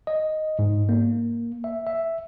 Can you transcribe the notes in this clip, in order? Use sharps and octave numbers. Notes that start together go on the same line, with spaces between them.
D#5
G#2
A#3
E5
E5